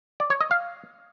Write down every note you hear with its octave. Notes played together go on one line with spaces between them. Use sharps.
D5
C#5
D#5
F5